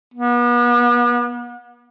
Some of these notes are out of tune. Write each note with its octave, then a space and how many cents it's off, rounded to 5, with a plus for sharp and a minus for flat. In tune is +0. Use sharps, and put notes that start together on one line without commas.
B3 -40